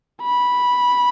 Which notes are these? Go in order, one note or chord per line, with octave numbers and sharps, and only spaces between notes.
B5